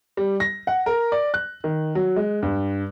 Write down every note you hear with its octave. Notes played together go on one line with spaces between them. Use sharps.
G3
A#6
F#5
A#4
D5
F#6
D#3
F#3
G#3
G2